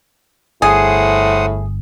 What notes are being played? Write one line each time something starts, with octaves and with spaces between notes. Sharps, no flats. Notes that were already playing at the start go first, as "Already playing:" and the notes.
G1 A2 G#4 C5 F#5 D#6